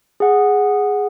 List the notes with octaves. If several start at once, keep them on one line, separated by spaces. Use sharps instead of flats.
G#4 F#5